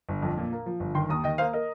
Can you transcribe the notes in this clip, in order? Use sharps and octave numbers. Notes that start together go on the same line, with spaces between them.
G1
F2
A#2
A#3
F3
G1
D#3 G5 C6
D#2 A#5 D#6
D#3 D#5 G5
A#3 C5 F5
A#4 D#5